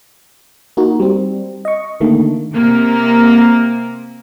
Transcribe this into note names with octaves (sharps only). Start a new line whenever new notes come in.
A#3 D#4 F#4
G3 C4
D#5 C#6
D3 D#3 A3 A#3
C3 A#3